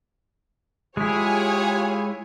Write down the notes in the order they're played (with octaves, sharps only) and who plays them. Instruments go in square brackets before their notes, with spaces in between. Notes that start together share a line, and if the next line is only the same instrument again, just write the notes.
[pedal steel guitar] G#3 E4 [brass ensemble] F4 G4 G#4 [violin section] C#5 G#5